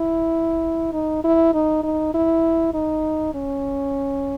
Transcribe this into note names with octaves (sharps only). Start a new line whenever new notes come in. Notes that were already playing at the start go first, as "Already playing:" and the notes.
Already playing: E4
D#4
E4
D#4
D#4
E4
D#4
C#4